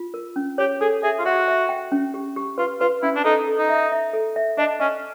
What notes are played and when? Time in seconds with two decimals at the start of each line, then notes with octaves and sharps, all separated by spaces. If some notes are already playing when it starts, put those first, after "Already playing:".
Already playing: F4
0.14 A#4
0.36 C#4
0.58 G4 C#5
0.81 G#4 A4
1.03 G#4 E5
1.19 F4
1.25 F#4 E5
1.48 E5
1.69 G5
1.92 C#4
2.14 G4
2.36 G4
2.58 F4 B4
2.81 F4 B4
3.03 C#4 E4
3.16 D4
3.25 D#4 A4
3.48 A4
3.58 D#4
3.69 E5
3.92 E5
4.13 A4
4.36 E5
4.58 D4 D#5
4.80 C#4 D#5